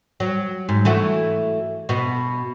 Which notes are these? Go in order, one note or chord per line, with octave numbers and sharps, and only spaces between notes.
F#3
G#2
E3 A3 F#4
B2 B3